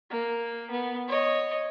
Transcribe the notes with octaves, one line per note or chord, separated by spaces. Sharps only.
A#3
B3
C#5 D#5